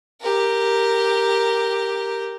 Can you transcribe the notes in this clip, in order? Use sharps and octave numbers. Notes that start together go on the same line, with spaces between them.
G4 A#4